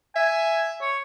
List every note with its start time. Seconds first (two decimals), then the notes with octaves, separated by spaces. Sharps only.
0.16 E5 G#5
0.81 C#5